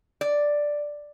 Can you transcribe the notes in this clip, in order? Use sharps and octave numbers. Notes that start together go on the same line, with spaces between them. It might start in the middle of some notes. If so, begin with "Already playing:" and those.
D5